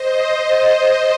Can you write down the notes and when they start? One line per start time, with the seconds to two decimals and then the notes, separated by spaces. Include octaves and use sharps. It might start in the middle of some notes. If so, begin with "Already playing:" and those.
Already playing: C5 D#5
0.44 C5 D#5